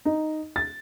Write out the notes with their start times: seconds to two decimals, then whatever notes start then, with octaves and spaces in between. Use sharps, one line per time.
0.05 D#4
0.56 A6